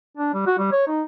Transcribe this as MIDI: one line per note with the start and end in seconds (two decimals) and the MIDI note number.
0.17 0.32 62
0.34 0.42 55
0.47 0.54 66
0.58 0.70 55
0.72 0.87 73
0.87 1.02 63